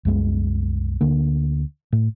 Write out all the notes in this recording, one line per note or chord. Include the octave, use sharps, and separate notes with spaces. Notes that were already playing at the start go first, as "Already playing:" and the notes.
C2 F#2 G#3 B3
D2 D3 A#3
A2